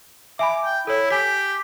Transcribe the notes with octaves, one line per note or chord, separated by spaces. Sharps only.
E5 G#5 B5 D6
G5
E4 A4 C#5
G4 G#5 B6